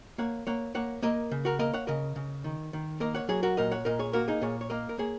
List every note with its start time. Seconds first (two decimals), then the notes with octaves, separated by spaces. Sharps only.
0.18 A#3 C#5 F#5
0.47 A#3 C#5 F#5
0.75 A#3 C#5 F#5
1.03 A#3 A#4 D#5
1.31 C#3
1.45 F#4 A#4
1.59 A#3 A#4 D#5
1.73 C#5 F#5
1.87 C#3 A#4 D#5
2.16 C#3
2.44 D#3
2.73 D#3
3.00 A#3 A#4 D#5
3.15 C#5 F#5
3.29 F#3 G#4 C#5
3.43 F#4 A#4
3.57 A#2 A#4 D#5
3.71 C#5 F#5
3.85 A#2 A#4 D#5
3.99 G#4 C#5
4.13 A#3 F#4 A#4
4.28 D#4 G#4
4.42 A#2 G#4 C#5
4.61 C#5
4.70 A#3 A#4 D#5
4.89 A#4
4.98 A#3 G#4 C#5